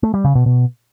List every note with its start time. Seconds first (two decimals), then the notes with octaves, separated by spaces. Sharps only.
0.03 A3
0.14 G3
0.24 C#3
0.35 B2
0.46 B2